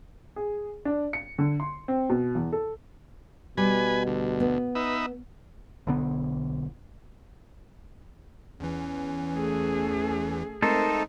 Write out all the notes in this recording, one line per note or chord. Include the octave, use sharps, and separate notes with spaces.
G#4
D4
C#7
D3
C6
C4
B2
E2
A4
B2 G3 B4 G#5
D2
B3
D#4 B4 E5
B1 D3 B3
E2 E3 C#4
A3 G#4
G#3 A3 C4 D#4 A4 A#4 C5